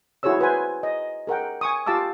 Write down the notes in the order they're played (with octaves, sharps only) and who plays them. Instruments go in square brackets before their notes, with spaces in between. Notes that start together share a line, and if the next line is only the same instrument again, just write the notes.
[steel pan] E4 F#4 G#4 C5 C#5 E6
F#4 B4 C5 G#5
D#5
G#4 A#4 F#5 G5
G#5 C#6 D#6
F4 G4 F5 A5 D6 E6